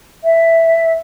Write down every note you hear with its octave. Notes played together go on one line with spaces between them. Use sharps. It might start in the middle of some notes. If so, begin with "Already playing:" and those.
E5